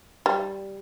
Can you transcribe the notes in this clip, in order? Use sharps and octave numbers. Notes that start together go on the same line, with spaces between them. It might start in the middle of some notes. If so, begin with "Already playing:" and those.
G3